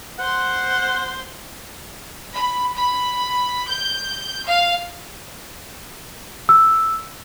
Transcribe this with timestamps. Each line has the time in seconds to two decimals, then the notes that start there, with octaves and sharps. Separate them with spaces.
0.20 C5 F#5 C6
2.34 B5
2.76 B5
3.68 G6
4.46 F5
6.49 E6